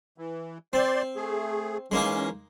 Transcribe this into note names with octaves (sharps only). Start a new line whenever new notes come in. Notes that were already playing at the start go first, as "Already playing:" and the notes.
E3
C4 C5 D5 C6
A3 G#4
E3 G#3 A#3 C#4 D#4